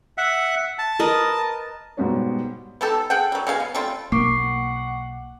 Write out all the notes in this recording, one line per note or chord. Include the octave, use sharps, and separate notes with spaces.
E5 F#5
A5
A#4 B4 D#5
G#2 B2 G3 B3 D#4 C#5
B3 D#4 G4 A4
G#4 F#5 G5
F#3 G3
B2 G#4 F5 G#5
B3
G3 A3 C4 F4
B1 A#3 F#5 C#6 D6 C7